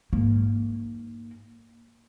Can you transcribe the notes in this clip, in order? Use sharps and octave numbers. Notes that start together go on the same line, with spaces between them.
G#2 A#3